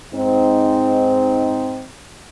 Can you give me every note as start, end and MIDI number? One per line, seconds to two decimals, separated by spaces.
0.14 1.85 44
0.14 1.85 60
0.14 1.85 63